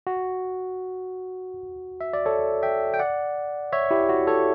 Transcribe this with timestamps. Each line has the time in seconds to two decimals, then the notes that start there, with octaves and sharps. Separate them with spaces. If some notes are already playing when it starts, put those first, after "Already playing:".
0.07 F#4
2.01 E5
2.13 D5
2.25 A4 C#5
2.63 E5 G5
2.94 G5
2.99 D5 F#5
3.72 C#5 E5
3.91 E4 G4
4.09 F#4
4.27 A4 C#5